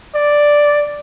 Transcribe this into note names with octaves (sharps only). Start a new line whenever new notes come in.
D5